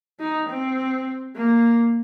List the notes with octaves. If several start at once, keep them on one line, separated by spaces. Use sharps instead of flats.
D#4
C4
A#3